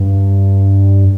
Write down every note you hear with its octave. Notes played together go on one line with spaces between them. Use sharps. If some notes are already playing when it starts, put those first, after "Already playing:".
Already playing: G2